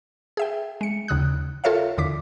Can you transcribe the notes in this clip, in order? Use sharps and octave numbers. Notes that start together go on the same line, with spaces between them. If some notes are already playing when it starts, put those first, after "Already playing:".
G#4 E5 G5
G#3 C#7
D#2 C#3 D#6 F#6
F4 A4 A#4 C#5 E5 F5
E2 D3 D6 B6